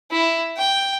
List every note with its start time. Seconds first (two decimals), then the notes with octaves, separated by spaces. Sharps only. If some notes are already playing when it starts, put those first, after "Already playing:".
0.12 E4
0.57 G5